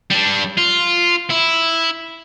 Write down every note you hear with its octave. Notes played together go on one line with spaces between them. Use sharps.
G3 D4
F4
E4